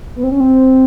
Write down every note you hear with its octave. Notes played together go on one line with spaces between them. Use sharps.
B3
C4
C#4
C4